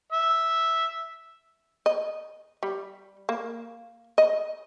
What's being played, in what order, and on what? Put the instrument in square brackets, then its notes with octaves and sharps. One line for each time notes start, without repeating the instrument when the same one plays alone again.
[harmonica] E5
[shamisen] D#5
G3
A#3
D#5